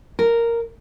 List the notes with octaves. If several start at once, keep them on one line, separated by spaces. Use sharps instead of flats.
A#4